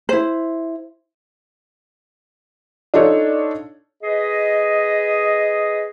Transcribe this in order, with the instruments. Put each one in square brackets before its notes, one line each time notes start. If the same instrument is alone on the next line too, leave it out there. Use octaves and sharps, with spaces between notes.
[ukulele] E4 C5
[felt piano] D4 D#4 F4 A4 C#5
[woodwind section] G#4 B4 D#5